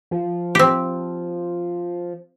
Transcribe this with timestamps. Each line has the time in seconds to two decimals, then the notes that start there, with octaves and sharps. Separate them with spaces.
0.11 F3
0.55 C4 G4